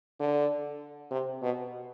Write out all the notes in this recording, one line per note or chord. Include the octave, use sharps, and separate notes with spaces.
D3
C3
B2